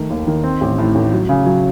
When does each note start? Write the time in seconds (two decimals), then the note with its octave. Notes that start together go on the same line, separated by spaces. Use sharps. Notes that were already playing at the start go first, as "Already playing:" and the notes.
Already playing: D#3 A3
0.10 D#2
0.27 D#3
0.44 C4
0.61 A1
0.78 A2
0.95 A1
1.13 F#3
1.29 C#3
1.46 F#3